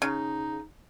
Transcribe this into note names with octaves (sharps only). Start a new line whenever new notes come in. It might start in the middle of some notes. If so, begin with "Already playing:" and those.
C#3 D#4